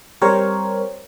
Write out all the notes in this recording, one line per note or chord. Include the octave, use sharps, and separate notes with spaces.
G3 C4 G4 A#4 C5 C#5